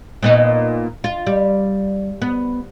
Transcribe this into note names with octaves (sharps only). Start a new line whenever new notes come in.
A#2 B3 D#4
F4
G3
B3